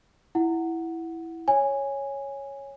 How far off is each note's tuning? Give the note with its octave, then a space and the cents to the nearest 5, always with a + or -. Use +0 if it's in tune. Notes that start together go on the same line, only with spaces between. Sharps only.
E4 +0 F#5 +0
C#5 +0 G#5 -10